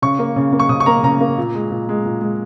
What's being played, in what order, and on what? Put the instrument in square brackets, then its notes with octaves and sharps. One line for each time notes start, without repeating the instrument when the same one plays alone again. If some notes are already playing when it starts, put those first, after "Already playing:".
[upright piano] C#3 C#6
A#3
C#3
A#3
C#6
C#3 D#6
C#6
A#3 A#5
C#3 A#5
A#3
A#2
G#3
A#2
G#3
A#2
G#3